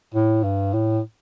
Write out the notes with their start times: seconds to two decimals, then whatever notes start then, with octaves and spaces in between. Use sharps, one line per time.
0.14 A2
0.43 G2
0.73 A2